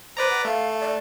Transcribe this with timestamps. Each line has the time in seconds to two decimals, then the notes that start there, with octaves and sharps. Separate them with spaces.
0.17 B4 C5 D5 A#5
0.29 F#5
0.45 A3 F5
0.80 D5